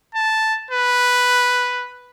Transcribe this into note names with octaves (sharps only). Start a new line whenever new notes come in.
A5
B4